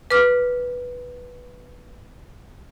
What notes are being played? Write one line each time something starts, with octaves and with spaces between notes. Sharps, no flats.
B4 D6 F6